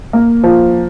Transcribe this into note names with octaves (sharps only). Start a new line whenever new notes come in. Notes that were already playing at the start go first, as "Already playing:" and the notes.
A#3
F3